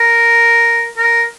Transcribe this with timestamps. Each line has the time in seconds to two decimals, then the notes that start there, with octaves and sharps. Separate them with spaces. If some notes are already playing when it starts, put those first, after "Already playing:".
Already playing: A#4
0.97 A#4